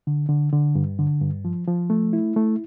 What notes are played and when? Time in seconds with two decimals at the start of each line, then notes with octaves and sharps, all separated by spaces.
0.07 D3
0.29 D3
0.52 D3
0.75 G2
0.99 D3
1.22 G2
1.45 F3
1.67 F3
1.90 A3
2.13 E4
2.36 A3